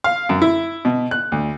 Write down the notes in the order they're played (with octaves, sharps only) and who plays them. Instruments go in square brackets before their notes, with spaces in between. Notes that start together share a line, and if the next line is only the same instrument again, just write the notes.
[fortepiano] F5
F#2
E4
B2
F#6
D2